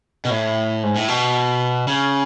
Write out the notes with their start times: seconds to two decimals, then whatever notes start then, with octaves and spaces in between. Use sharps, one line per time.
0.25 B2
0.30 A2
0.83 G#2
0.96 A2
1.08 B2
1.87 C#3